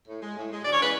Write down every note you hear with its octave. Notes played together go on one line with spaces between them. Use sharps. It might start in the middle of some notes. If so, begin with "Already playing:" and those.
A2
G#3
A2
G#3
D2 D5
C#5
C#3 E3 G#3 B4